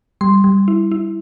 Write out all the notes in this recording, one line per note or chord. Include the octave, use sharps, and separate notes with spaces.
G3 C6
G3
E4
E4